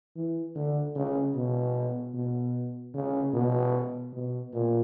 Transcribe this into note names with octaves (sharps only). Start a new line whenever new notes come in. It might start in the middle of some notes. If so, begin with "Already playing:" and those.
E3
D3
C#3
B2
B2
C#3
B2
B2
A#2